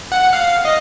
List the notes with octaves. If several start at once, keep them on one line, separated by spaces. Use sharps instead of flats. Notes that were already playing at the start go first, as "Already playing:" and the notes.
F#5
F5
D#5